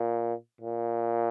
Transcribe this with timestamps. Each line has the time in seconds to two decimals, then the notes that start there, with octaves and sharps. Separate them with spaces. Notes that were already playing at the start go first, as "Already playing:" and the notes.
Already playing: A#2
0.61 A#2